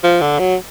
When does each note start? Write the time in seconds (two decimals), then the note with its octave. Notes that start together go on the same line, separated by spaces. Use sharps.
0.04 F3
0.21 D3
0.39 F#3